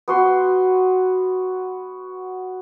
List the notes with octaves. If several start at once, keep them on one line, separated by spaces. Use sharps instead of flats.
B3 F#4 C6